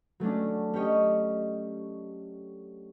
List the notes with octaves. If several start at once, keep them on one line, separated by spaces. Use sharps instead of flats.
F#3 A3 C#4 D4
C#4 G4 C#5 D#5